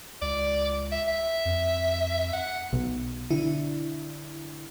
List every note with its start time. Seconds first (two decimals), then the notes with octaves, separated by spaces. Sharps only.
0.21 C#2 D5
0.92 E5
1.08 E5
1.45 F2
2.33 F#5
2.73 B1
3.30 D3 E4